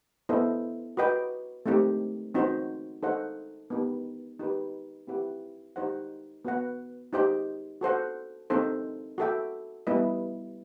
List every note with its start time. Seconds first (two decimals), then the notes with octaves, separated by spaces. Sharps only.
0.29 B3 E4 A4 C5 D#5
0.97 F#4 B4 D#5 G5
1.66 A3 C4 D#4 G4
2.35 C4 D#4 F#4 C5
3.03 D#4 A4 C5 D#5 F#5
3.70 B3 D#4 G4 B4
4.39 D#4 G4 B4
5.07 C4 E4 G4 B4 F#5
5.76 D#4 G4 C5 F#5
6.45 B3 F#4 B4 F#5
7.13 D#4 G4 C5 D#5 G5
7.81 F#4 A4 C5 F#5
8.50 C4 D#4 A4 C5
9.18 F#4 A4 E5 G5
9.87 G3 B3 E4 B4 D#5